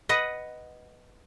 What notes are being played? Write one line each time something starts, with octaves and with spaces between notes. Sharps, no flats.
B4 D#5 F#5